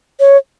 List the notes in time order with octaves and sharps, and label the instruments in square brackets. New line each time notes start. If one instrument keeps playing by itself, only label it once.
[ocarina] C#5